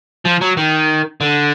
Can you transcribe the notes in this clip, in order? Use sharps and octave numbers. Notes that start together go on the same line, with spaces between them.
F3
F#3
D#3
D3